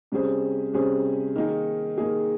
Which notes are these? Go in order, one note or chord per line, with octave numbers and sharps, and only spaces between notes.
C3 G3 C#4 G#4 C5
C3 G3 C#4 G#4 C5
D#3 A#3 D#4 G#4
D#3 A#3 D#4 G#4